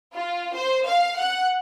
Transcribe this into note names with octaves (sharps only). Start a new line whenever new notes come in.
F4
C5
F5
F#5